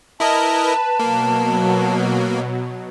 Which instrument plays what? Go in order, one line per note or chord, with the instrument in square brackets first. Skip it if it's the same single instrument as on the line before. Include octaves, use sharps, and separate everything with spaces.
[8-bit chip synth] E4 A#4 D#5 [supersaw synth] B4 [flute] A5
[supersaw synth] B2 F#3 [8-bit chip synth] A#3